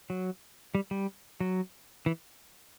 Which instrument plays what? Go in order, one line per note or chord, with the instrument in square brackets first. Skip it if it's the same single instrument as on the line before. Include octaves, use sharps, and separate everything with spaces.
[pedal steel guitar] F#3
G3
G3
F#3
E3